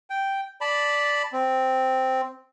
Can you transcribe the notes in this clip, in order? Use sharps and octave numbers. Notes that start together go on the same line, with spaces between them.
G5
D5 A5 B5
C4